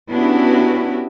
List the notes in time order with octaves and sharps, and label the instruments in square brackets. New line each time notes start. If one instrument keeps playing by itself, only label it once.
[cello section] B3 C#4 D4 E4 F#4 G4